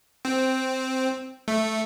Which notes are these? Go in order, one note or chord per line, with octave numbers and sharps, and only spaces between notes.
C4
A3